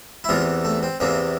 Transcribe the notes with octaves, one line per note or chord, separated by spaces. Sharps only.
E4
E2 C3 E3 F4
A3
C4
E2 C3 E3 A#3